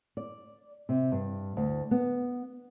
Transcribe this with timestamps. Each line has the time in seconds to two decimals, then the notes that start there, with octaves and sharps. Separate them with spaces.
0.17 D5
0.89 C3
1.12 G2
1.57 D2
1.91 B3